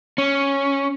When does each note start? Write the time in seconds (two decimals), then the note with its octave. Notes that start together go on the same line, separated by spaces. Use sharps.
0.18 C#4